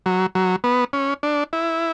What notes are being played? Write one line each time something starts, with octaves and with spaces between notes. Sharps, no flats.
F#3
F#3
B3
C#4
D4
E4